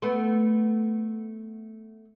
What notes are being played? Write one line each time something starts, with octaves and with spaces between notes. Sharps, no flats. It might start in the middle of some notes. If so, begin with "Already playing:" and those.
A3 B3